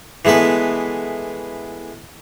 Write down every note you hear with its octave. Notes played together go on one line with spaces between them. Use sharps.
E3 G#3 A3 B3 B4